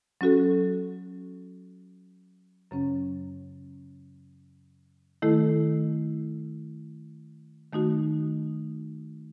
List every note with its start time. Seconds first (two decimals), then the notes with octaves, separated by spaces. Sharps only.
0.21 F#3 C#4 F#4 A4
2.71 F#2 C#3 F#3 C#4
5.22 D#3 A3 E4 A4
7.73 D#3 A3 D#4 F#4